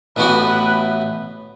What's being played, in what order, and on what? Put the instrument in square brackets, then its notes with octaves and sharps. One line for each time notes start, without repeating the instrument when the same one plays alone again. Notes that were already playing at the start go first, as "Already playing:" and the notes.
[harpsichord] A1 A2 E3 B3 F#4 [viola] B4
[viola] B4